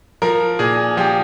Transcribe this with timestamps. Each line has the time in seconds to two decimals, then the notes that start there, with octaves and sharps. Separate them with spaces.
0.22 F3 A#4
0.59 A#2 G#4
0.97 F3 G4